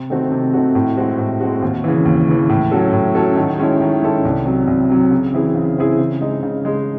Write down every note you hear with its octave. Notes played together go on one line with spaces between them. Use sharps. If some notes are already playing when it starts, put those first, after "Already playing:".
Already playing: C3
D#3 A3 C4 F#4
C3
D#3 A3 C4 F#4
A2
G#3 C4 F#4
A2
G#3 C4 F#4
D#2
C#3 E3
D#2
C#3 E3
A2
F#3 C#4 F#4 A4
A2
F#3 C#4 F#4 A4
D#3
G#3 C#4 E4 A4
D#3
G#3 C#4 E4 A4
C2
C3 F#3
C2
C3 F#3
C#3
E3 C4 E4 G#4
C#3
E3 C4 E4 G#4
C#3
G#3 D#4 G#4
C#3
G#3 D#4 G#4